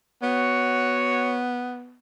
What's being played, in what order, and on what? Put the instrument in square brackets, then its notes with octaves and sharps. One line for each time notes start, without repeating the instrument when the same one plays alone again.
[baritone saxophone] B3 [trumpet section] F#4 C#5